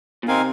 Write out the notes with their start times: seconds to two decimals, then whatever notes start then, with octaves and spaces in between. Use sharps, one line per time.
0.23 A#2
0.27 C3 C4 D#4 A#4 F5 G#5